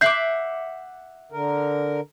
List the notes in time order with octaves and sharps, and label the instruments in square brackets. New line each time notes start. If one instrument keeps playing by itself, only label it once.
[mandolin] E5 F#5 D6 [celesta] G6 C7
[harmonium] D3 A#4